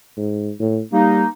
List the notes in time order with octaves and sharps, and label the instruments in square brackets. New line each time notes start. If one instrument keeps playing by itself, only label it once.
[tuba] G#2
A2
[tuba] G3 [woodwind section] A#3 D#4